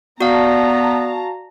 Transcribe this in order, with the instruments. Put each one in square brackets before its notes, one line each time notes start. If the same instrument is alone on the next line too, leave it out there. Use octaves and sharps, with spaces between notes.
[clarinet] B3 [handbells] F#4 F5 [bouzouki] D5 [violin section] A5 A#5